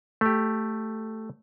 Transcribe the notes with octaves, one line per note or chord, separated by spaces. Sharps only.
A3 G4